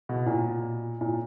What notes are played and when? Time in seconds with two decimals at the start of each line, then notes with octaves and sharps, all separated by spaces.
0.09 B2
0.26 A#2
1.01 A#2